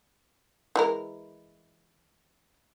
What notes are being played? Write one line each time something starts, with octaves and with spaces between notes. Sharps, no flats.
E3 G#3 A#4